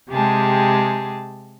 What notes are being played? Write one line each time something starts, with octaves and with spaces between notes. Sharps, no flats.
C3 G#3 G4 G#4 A5